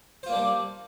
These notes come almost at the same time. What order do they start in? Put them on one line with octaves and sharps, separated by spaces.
C5 F4 A#3 D4 G3